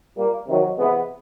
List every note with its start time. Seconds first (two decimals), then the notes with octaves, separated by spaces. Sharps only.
0.15 A#2 G3 A#3
0.47 C3 D#3 F#3
0.78 C3 E3 G#3 B3